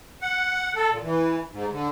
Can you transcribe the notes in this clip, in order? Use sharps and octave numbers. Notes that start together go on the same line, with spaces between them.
F#5
A4
A#2
E3
G#2
D3